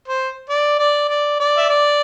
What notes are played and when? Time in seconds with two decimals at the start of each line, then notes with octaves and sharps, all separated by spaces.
0.08 C5
0.49 D5
0.79 D5
1.09 D5
1.40 D5
1.57 E5
1.69 D5